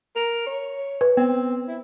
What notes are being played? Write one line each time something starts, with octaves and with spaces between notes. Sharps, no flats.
A#4
C#5
B4
B3 C4
E4